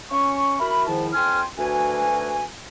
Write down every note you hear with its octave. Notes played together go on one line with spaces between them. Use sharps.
C#4 C#6
E4 F#4 A#4 B5
G#2 D#3 F3 E4 A5
F2 G5 G#5 C6 F6
D2 F#4 B4 G#5